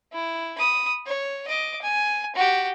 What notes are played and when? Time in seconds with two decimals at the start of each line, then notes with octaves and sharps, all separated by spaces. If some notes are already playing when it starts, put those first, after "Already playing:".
0.13 E4
0.58 B5 D#6
1.06 C#5
1.48 D#5 D6
1.82 G#5
2.36 F#4 G4